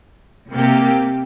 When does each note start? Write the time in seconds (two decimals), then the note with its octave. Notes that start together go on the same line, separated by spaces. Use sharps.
0.53 C3 A#3 G4